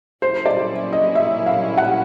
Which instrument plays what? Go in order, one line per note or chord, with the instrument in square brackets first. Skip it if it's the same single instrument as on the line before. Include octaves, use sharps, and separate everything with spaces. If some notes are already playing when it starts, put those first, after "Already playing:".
[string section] C#3 F#3 A#3 C#4 E4 [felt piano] C5
[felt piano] D5
D#5
E5
F5
F#5